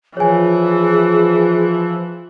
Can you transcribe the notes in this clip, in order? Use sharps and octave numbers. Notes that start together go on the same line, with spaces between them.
E3 F3 G#4 C#5 G#5